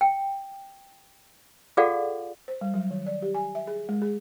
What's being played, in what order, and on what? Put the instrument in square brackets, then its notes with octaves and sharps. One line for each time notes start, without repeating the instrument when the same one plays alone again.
[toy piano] G5
F4 G#4 A4 D5 F5 F#5
[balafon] C5
G3
F#3
D#3
D5
G4
G#5
E5
G#4
G#3
G#4